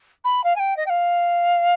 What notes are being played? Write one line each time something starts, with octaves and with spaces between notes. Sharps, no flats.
B5
F5
G#5
G5
D#5
G5
F5